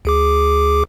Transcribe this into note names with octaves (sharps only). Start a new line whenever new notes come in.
D2 G#4 D6